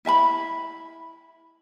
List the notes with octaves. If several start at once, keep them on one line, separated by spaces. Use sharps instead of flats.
E4 E5 A5 B5